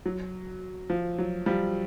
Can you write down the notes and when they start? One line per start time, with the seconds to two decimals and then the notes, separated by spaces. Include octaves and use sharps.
0.06 F#3
0.90 F3
1.18 F#3
1.46 F3 G3